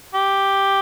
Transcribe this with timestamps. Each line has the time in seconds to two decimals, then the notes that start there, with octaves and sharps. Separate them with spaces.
0.14 G4